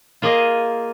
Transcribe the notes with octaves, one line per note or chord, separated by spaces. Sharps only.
A#3 F4 G#4 D#5